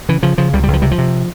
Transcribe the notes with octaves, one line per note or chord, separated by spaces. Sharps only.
C#3 E3
C#3 F3
C#3 F3
C#2 G3
G3
C#2
F3
C3 G3
F3
C3